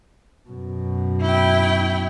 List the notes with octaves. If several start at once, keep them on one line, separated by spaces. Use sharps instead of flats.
F#2 B2
E4 G5